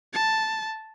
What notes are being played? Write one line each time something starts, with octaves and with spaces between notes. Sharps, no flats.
A5